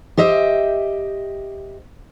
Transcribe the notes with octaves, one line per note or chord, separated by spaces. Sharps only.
G4 C5 D#5 E5